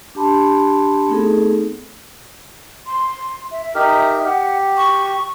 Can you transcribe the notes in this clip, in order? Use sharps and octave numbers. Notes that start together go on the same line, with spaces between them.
D4 G4 A5 B5 C6
A3 B3 C4 D#4 G#4 A4
C6
E5
D#4 G4 A#4
G4 F#5
C#6